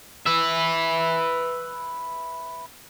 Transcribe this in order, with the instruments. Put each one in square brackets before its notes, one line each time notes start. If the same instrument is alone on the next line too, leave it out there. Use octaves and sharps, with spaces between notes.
[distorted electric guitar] B4 E5